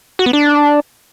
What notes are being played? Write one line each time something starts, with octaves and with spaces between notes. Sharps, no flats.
F#4
B3
D4